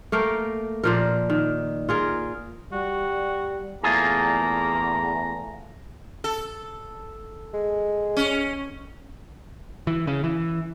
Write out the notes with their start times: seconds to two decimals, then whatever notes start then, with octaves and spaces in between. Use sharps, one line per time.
0.12 A3 A#3 A#4 G5
0.84 A#2 F3 A#4
1.30 D#3
1.89 F4 G#4 A#4
2.72 G3 F#4
3.84 E2 A3 A#3 F4 G#4 A#5
6.24 A4
7.54 G#3
8.17 C#4
9.87 E3
10.07 C#3
10.24 E3